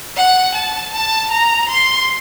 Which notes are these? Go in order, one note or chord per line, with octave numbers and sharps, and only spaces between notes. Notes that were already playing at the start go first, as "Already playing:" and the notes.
F#5
A5
A5
A#5
C6